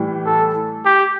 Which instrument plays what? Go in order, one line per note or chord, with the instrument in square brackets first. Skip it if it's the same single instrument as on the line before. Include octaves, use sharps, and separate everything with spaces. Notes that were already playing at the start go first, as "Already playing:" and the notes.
Already playing: [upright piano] A2 E3 G3
[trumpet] A4
G4